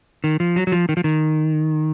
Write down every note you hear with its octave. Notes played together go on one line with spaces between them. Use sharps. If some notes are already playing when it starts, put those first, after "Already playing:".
D#3
F3
F#3
F#3
F3
D#3
F3
D#3